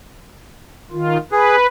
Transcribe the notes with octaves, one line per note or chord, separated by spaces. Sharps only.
D#3 F4
G#4 B4